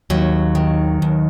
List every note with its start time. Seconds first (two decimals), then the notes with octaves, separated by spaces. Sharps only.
0.10 D#2 F#3
0.55 D#3
1.02 D#2